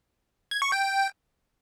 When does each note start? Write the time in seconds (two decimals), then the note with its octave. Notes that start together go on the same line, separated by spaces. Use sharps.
0.51 G#6
0.62 C#6
0.72 G5